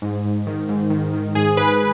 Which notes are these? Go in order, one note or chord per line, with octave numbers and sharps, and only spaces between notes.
G#2
G#2
D#3
G#2
D#3
D#3
G#2 G#4
G#2 B4